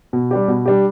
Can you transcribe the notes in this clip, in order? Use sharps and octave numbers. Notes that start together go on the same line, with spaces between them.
B2
G3 D4 G4
B2
G3 D4 G4